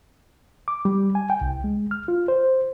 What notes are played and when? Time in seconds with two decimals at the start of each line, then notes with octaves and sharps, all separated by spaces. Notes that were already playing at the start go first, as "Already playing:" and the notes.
0.68 D6
0.85 G3
1.15 G#5
1.30 G5
1.41 C2
1.64 G#3
1.91 F6
2.08 F4
2.28 C5